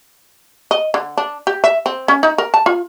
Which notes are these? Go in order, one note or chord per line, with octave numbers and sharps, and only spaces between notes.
D#5
D3
D4
G4
E5
C4
C#4
D#4
A#4
A5
F4